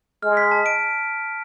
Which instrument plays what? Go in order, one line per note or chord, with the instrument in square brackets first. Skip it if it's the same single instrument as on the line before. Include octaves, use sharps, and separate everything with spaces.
[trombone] G#3 [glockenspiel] F6
[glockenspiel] B6
A5
D7